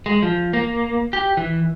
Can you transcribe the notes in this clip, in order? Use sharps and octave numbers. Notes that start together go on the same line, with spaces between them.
G#3
F3
A#3
G4
E3